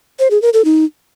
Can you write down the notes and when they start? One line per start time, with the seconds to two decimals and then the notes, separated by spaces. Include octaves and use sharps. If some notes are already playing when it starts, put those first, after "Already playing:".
0.19 C5
0.31 G#4
0.42 A#4
0.53 A4
0.65 D#4